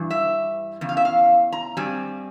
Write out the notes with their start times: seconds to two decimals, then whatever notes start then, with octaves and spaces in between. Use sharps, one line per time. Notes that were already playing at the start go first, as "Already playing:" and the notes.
Already playing: G2 E3
0.10 E5
0.81 E2 C#3
0.89 F5
0.97 E5
1.05 F5
1.52 A#5
1.77 G2 G3 C4 G#5